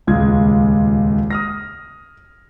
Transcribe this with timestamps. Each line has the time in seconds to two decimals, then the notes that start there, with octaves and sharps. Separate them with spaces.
0.07 D#1 C#2 G#3 F4 G#6
1.30 D#6 F6 A#6